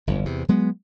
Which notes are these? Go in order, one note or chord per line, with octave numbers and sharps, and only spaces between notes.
G1 F2
E2 C3
F#3 G#3 B3